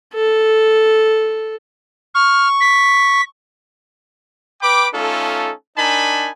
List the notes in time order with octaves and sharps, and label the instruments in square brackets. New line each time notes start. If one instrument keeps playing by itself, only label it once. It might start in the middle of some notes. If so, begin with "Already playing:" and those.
[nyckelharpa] A4
[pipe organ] C#6 [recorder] F6
[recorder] B6
[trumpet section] B4 G5 B5 D6
A3 C#4 D#4 F4 A4
D4 D#4 A#4 G#5 A5 B5